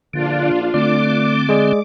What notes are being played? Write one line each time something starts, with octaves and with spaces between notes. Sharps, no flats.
A#1 D3 D4 F4
D3 A3 C4 D5 D6
G#3 G#4 D5